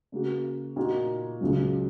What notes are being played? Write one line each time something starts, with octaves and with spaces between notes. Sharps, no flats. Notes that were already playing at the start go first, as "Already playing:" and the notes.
C#3 A#3 F#4
A#2 A#3 D#4 F#4
C#2 C#3 F#3